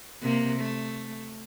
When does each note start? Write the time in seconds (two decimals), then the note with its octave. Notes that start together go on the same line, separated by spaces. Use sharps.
0.21 C3 A#3
0.60 A3